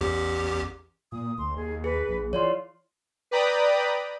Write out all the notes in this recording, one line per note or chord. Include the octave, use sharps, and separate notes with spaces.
A1 E2 G4
A#2 D#6
D2 C6
D#2 G#4
G#4 B4
A#1
E3 F4 C#5 D5 C6
B4 D5 G5 A#5 B5 D#6